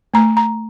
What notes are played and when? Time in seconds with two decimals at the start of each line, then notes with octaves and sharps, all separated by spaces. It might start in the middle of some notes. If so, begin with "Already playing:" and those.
0.14 A3 A#5
0.37 A#5